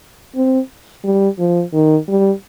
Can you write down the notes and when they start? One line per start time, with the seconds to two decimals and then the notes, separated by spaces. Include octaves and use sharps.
0.35 C4
1.04 G3
1.39 F3
1.73 D#3
2.08 G3